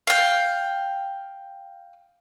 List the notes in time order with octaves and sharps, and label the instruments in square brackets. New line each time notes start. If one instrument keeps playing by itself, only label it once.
[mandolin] F5 G5